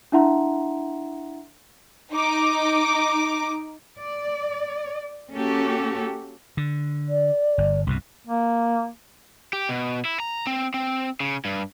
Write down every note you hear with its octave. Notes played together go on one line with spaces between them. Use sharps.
D4 E4 E5 F#5 A#5 C6
D#4 D6
D5
A#3 C#4 F#4 G4 A4
D3
D5
G1
C2 G2 B2
A#3
G4
B2
E4
A#5
C4
C4
C#3
G2